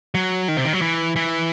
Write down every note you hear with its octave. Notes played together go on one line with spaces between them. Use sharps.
F#3
D#3
C3
D#3
F#3
E3
E3